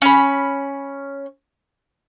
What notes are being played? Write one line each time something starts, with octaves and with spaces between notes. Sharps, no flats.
C#4 B5